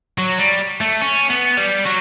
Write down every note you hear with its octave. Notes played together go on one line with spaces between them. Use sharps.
F#3
G3
A3
C#4
B3
G3
F#3